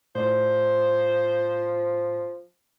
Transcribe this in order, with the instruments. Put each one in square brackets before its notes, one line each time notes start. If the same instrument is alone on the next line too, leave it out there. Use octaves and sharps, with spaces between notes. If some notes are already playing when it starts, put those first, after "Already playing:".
[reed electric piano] A2 D5 [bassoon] F3 [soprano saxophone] C5